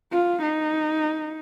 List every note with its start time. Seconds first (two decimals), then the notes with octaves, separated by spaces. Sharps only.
0.12 F4
0.42 D#4